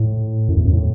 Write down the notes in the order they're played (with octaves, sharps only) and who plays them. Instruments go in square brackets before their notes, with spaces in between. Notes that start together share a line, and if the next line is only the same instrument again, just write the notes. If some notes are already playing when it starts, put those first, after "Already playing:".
Already playing: [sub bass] A2
F#2
E2
F#2
A2